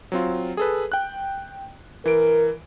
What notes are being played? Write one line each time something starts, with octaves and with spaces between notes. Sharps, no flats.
F#3 C4 F4
G#4 A4 B4
G5 F#6
E3 A#4 D7